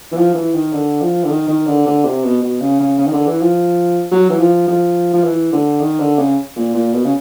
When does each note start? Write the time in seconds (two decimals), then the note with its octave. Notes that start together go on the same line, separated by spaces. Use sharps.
0.12 E3
0.16 F3
0.34 E3
0.54 D#3
0.73 D3
1.01 F3
1.24 D3
1.30 D#3
1.48 D#3
1.67 D3
1.86 D3
2.04 C3
2.24 B2
2.42 B2
2.61 C#3
2.80 C#3
2.98 C#3
3.07 D#3
3.13 D3
3.26 E3
3.41 F3
4.11 F#3
4.29 E3
4.39 F3
4.67 F3
5.13 F3
5.24 E3
5.52 D3
5.81 D#3
5.99 D3
6.18 C#3
6.56 A#2
6.74 A#2
6.93 B2
7.05 C#3